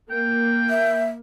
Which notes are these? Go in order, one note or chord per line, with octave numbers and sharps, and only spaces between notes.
A#3 G5
E5